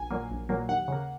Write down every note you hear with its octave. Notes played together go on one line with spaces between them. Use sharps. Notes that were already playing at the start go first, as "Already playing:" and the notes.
Already playing: A#1 G#5
A#2 F#3 A#3
A#1
A#2 F#3 A#3
D#2 F#5
C#3 A#3